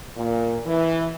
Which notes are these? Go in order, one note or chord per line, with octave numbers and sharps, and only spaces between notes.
A#2
E3